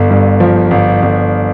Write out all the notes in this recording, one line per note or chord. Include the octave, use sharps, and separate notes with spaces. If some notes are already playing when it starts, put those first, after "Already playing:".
Already playing: G1
G2
F3
G1
G1